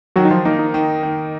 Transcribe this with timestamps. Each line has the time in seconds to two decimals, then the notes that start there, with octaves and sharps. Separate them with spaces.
0.16 D#3 F#3 F#4
0.25 D#4
0.31 F3 F4
0.45 A#3 D#4
0.59 D#4
0.74 D#3
1.03 D#3